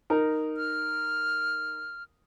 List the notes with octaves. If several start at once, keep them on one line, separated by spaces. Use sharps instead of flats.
D#4 A#4
F6